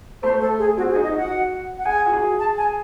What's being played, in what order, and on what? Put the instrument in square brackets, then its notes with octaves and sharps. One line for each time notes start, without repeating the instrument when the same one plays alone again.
[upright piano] A3 [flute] C5
[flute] A4
G#4
[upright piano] C4 [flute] F#4
[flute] G#4
[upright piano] D#4
[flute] D#5
[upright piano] F#4 [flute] F#5
[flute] F#5
[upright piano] G#4 [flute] G#5
[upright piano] F#4
G#4
[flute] A5
G#5